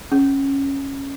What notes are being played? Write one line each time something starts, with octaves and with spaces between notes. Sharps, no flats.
C#4